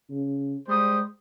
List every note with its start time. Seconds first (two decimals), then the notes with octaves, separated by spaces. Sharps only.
0.10 C#3
0.69 G3 G#3 C5 D#6